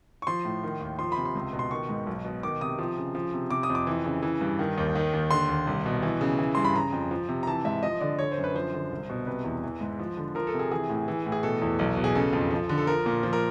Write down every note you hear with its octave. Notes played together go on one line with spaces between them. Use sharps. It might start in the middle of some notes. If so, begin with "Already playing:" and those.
C#6
F3 C6
A2
D#3
D#2
F3 C6
C3 B5
C6
C#2
B2
C6
D#3 C#6
G#2
B1
B2
D#3 D6
C3 D#6
F3
C#3
F3
C3
C3 D6
D#6
F2
D6
E3
C#3
E3
G2
D#3
D#2
D#3
D#2
D3 C6
D#2
C2
B2
E3
C#3
E3
G2 C6
B5
C#3 A#5
F2
F3
C3
A#5
E3 A5
G#2 E5
F3 D#5
D3 D5
D3 C#5
C5
F#2
B4
F3 C5
D3
C2
B2
C3 B4
E2
E3
G#2
F3
D3
F3 A#4
A4
C3
G#4
E3 G#4
A2
E3
A2
G#4
B2 A4
E2
B1
B2
G#4
C#3 A4
F2
F3
D3
A4
F3 A#4
A#2
F3
A#4